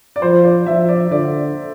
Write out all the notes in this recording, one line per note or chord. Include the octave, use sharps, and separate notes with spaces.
D5
F3 C5
D5
F3 E5
D5
D3 D5